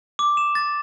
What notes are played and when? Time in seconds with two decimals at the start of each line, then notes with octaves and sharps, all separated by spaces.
0.19 D6
0.37 E7
0.55 A6